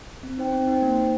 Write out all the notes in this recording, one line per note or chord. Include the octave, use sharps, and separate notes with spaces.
C4
D#4 C5 G5
C4
D#4 C5 G5
A#3
D#4 C5